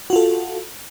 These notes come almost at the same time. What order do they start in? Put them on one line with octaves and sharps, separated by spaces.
F#4 F4 A4